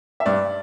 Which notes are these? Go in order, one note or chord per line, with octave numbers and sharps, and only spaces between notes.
E5
G2 D5